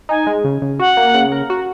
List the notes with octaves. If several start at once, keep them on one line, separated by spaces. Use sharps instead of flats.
D#4 G#5
G#3
C#3
C#3
F#4 F#5
A#3
C#3
A#4
F#4